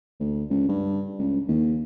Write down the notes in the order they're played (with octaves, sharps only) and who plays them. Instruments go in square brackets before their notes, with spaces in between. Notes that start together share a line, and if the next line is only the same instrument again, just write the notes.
[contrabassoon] D2
C#2
G2
C#2
D#2